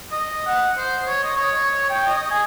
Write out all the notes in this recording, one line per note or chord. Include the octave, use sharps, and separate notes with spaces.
D#5
F#5
C5
C#5
D#5
C#5
G5
D#5
G#5